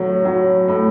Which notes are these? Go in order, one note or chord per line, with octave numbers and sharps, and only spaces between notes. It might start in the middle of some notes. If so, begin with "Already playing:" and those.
Already playing: A2 F#3
F#3
A2